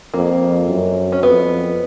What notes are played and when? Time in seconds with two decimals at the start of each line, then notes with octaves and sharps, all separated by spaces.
0.14 F2 A#3
0.69 F#2
1.12 C#4
1.23 F2 B3